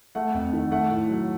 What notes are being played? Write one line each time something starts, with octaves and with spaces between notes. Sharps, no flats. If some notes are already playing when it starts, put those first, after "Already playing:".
A3 F#5
F2
D#3
A3 F#5
A2
F#3